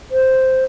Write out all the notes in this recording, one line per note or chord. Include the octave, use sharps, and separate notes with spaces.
C5